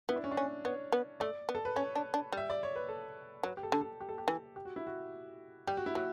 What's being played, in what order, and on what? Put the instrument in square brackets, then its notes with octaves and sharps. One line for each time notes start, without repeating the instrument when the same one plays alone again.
[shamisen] B3 [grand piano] E4
[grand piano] D4
C#4
D4
[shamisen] C#4
[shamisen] B3 [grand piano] C#5
[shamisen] B3
[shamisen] A3 [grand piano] D5
[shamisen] B3
[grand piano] A4
B4
[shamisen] C#4 [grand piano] C#5
[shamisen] D4
D4
[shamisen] G3 [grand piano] E5
[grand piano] D5
C#5
B4
A4
[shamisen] F#3 [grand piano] B4
[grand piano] G4
A4
[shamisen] D3
[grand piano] A4
G4
A4
G4
[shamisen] E3
[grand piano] G4
F#4
E4
F#4
[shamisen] G3 [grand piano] G4
[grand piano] F#4
E4
[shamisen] F#3 [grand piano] F#4